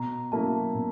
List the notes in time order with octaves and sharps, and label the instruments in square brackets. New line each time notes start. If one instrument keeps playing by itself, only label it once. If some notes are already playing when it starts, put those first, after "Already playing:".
Already playing: [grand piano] B2 [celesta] A#5
[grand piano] F#3 A#3 C#4 E4 [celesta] A5
[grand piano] B2